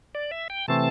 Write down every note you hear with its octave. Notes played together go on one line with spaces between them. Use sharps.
D5
E5
G5
C3 E3 A3 C4 A5